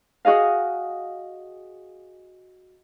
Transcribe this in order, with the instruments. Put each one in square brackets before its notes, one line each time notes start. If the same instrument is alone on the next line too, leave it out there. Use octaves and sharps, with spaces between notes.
[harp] F#4 G#4 D#5 F5